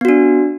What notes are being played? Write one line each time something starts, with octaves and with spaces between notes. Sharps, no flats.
B3 D4 F#4